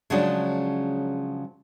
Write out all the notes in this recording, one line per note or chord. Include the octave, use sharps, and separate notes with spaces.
C#3 F3 F#3 G#3 C#4 D4